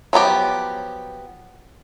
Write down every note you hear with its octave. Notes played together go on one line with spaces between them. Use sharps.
F3 F#3 B3 G4